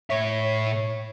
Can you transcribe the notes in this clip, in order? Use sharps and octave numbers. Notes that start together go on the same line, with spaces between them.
A2 C#5 E5